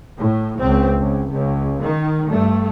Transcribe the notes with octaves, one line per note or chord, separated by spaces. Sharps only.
A2
C#2 C4
C#2
C#2
D#3
G2 A3